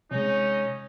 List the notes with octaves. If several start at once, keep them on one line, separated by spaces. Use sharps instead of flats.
C3 G#3 C#4 D#4